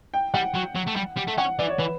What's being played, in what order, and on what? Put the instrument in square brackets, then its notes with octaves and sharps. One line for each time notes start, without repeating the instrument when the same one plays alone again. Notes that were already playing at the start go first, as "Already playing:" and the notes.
[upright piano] G5
[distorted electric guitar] G3 [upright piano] F#5
[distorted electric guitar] F#3
F#3
A3
G3
G3
A3
[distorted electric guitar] C#4 [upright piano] F#5
[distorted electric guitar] E3 [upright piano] D5
[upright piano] C#5
[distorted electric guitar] E3 [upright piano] B4